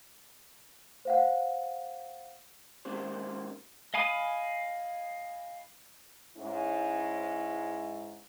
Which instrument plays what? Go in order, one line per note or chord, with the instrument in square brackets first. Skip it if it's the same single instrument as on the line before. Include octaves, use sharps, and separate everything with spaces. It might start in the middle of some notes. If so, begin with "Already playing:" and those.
[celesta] C5 F5 F#5
[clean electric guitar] G#2 D#3 A#3 C#4 G4 C5
[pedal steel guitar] D#5 F5 G#5 B5 D#6
[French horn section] G#2 C#4 E4